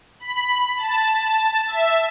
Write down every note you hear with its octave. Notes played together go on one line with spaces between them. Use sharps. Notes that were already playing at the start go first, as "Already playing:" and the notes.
B5
A5
E5